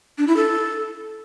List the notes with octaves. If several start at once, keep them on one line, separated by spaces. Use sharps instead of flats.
D4
E4
A4